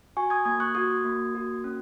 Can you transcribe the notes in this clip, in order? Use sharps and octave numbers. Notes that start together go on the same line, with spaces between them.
F#4 G#5 C#6
D#6 G#6
A#3 D#6 G#6
C#6 F#6
F#4 D#6 G#6
A#3
F#4
C#4